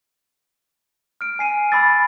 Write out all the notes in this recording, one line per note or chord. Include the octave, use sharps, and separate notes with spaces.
F6 D7
G#5 C7 D#7
B5 D6 E6 A6